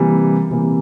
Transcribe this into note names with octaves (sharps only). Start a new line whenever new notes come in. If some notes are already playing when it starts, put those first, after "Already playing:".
Already playing: C3 E3 G3 A#3
C3 E3 G3 A#3